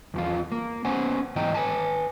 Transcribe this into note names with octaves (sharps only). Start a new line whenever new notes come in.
E2 F3 F4
A#3
B3 C#4 C5 F#5 G#5
G#2 E3 D#5 G5 A#5
B4 G#5 A5